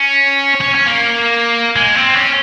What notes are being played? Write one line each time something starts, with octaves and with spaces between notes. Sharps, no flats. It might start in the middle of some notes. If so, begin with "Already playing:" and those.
Already playing: C#4
C#4
C#4
A#3
G#3
C4
C#4